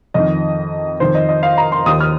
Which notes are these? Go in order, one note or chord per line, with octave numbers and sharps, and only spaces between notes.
F2 D#3 D#5
F2 D#3 C5
D#5
D#5
F5
A#5
C6
D#2 D#3 D#6
F6